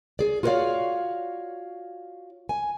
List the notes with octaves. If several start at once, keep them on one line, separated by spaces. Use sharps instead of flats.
G#4 D5
F4 F#4 A#4 C#5 D5 F5
G#5